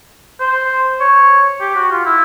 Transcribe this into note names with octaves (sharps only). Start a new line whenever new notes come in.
C5
C#5
G4
F#4
F4
E4